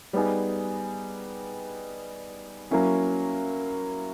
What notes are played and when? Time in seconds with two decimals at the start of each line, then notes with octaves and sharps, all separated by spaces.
0.13 G3 B3 D#4 G#4
2.71 F#3 A#3 C#4 E4